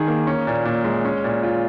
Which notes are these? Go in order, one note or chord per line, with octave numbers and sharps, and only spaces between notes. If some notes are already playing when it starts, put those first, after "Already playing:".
Already playing: D#3 D#4 G#4
A#3
C#4
A#2
A#2
G#3
C#4
A#2
F4